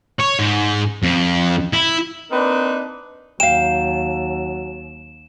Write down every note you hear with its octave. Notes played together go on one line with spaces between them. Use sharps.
C#5
G#2
F2
E4
A#3 C4 D4 D#4 A#4 B4
D#2 F#3 F5 G5 E7